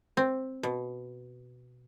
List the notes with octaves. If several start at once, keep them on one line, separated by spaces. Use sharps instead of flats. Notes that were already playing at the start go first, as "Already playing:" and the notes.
C4
B2